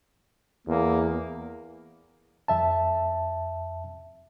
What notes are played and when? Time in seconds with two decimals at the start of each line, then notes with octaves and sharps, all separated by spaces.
0.67 E2 A#3
2.48 F2 E5 A5